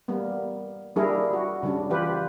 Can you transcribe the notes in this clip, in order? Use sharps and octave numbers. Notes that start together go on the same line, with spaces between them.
G3 A#3 B3
G3 A#3 D4 E4 G#4 A#4
F#4
C#3 G3 D4
E3 F4 G4 B4